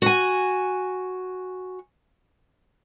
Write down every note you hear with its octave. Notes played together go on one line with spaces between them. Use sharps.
F#4 G#5